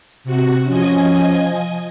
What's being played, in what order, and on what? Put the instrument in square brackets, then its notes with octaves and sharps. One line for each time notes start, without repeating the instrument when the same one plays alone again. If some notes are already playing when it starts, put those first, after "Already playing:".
[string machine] C3 F#4
[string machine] F3 D#5 G#5 [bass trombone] C#4